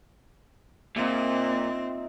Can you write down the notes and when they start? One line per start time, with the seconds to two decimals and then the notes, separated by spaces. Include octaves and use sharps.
0.96 A#2 C4 D#4 F4 E5